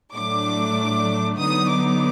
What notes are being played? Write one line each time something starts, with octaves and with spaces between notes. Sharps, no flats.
A2 F#3 A3 D4 D6
D3 F#3 B3 D#4 D#6
D6